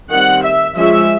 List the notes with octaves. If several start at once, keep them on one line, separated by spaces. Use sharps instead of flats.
D#3 G3 C4 F#5
E5
F3 G#3 C#4 E5